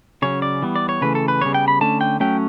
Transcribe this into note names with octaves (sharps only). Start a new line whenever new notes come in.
C#3 F#3 C#4 C#5
D5
E3 G3 B3
D5
C#5
C#3 E3 A3 B4
A4
B4
C#3 G3 B3 C#5
G5
B5
D3 A3 C#4 A5
G5
F#3 A3 C#4 G5